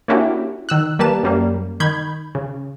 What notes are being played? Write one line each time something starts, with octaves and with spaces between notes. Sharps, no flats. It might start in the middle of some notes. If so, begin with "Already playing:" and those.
A#3 C#4 D4 E4 F#4 G4
D#3 E6 F#6
G3 A#3 B4 A5 E7
F#2 G3 A#3
D#3 B5 G6 G#6
C#3